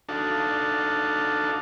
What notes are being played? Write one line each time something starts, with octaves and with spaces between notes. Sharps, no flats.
D4 D#4 F#4 A4 F5 A5